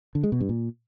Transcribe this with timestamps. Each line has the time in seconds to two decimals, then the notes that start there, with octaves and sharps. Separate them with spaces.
0.15 D3
0.24 G#3
0.32 B2
0.41 G2
0.49 A#2